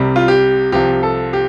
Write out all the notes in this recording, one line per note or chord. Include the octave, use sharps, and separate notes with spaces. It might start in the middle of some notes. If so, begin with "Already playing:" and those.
Already playing: C2 C3 G3
F4
G4
C2 C3 F3 G4
A4
G4